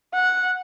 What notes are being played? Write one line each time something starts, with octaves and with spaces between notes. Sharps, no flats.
F#5